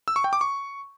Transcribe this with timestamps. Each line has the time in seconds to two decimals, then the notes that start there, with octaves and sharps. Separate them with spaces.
0.08 E6
0.16 C#6
0.24 G5
0.33 D6
0.41 C#6